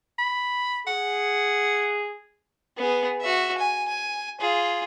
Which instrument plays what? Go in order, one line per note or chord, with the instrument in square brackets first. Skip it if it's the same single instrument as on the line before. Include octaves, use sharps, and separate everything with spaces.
[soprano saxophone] B5
[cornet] G#4 [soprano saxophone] F#5
[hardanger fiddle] B3 G#4
F#4 E5
G#5
G#5
F4 G#4